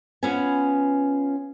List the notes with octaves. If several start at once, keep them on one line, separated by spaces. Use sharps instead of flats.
B3 C#4 F4 B4 G#5